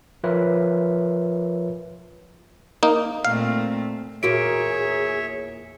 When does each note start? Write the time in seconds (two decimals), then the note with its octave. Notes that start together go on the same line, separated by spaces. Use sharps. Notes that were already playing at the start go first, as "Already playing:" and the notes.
0.24 F3 F4 A#4 B4 C#5 E5
2.83 A#3 D#4
3.25 A#2 A3 C4 F5
4.23 E2 A#2 A#3 F#4 G#4 C#5 E5 D7